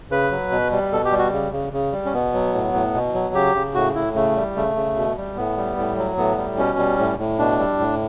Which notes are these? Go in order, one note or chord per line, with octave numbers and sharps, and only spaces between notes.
C#3 B4
F#3
B2
G3
B2 A4
G4
G3
F#4
C#3
C#3
C#3
G3
C#4
B2 B3
F#3
A2
A2
B2
F#3
C#3 G4
C#3
A2 F#4
A2 E4
C#3 A3
G3
C#3 A3
C#3
B2
G3
A2 B3
G3
A2
F#3
A2 B3
G3
B2 C#4
G3
A2
A2
B2 D4
G3
A2